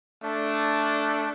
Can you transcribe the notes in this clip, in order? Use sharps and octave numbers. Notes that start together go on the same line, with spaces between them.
A3 D4